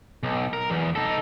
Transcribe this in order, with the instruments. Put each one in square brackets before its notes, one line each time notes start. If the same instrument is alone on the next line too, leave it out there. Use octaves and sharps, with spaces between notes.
[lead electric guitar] B1
A#4
E2
D#4 A4